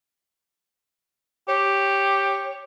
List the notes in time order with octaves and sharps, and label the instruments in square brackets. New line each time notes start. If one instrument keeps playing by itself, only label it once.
[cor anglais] G4 [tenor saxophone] C#5